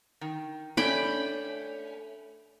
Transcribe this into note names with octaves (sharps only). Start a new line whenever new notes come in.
D#3
A3 C#4 D4 G5 B5